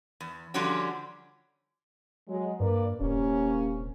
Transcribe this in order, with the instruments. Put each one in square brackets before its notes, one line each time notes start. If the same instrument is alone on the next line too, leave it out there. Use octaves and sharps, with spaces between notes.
[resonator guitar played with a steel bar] E2
D3 F3 G3 C#4 D4 F#4
[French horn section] F#3 G#3
[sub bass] G2 [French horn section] A#3 B4 D5
[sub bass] D#1 [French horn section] C3 A#3 C#4